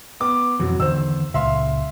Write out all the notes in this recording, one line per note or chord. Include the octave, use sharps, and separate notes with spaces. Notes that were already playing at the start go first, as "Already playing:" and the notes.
B3 D6
F2 B2 E3 F#3
E2 D3 D#3 C5 E6
C#2 A#2 E5 F5 C6